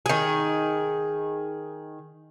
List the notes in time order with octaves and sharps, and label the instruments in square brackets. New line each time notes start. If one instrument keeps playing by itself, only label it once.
[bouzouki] D#3 G#4